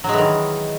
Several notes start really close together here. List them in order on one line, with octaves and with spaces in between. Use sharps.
F#3 G#3 E3 D#3